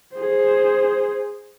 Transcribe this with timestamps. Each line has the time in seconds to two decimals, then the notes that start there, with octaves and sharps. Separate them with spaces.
0.16 G#4 C5